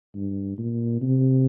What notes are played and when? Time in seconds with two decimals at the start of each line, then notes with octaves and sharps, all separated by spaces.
0.15 G2
0.58 A#2
1.02 C3